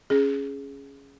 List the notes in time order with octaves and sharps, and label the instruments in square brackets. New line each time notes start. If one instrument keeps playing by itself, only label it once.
[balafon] C#4 G#4